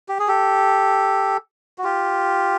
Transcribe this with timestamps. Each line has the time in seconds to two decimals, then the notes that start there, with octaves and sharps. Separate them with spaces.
0.09 G4
0.19 G#4
0.28 G4 A4
1.78 F#4
1.84 F4 G4